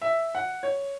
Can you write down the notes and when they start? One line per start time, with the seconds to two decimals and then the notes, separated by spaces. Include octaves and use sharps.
0.01 E5
0.35 F#5
0.63 C#5